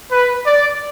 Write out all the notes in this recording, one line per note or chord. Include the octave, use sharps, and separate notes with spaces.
B4
D5